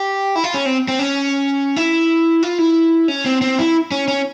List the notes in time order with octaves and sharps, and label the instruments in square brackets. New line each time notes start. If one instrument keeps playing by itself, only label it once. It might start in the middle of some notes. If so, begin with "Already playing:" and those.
Already playing: [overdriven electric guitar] G4
E4
F4
C#4
C4
C4
C#4
E4
F4
E4
C#4
C4
C4
E4
C#4
C#4